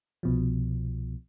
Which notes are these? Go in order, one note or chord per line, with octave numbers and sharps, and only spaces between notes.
C2 B2 F3